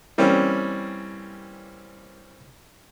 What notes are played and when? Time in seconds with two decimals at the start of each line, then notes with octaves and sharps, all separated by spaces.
0.18 E3 G3 A#3 C4 C#4